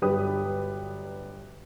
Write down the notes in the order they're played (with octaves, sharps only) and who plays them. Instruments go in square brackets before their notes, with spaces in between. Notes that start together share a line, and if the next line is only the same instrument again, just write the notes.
[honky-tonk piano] G1 F#3 D4 G4 B4 D#6